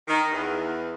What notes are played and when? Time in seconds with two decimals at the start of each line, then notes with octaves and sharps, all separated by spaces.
0.08 D#3
0.32 E2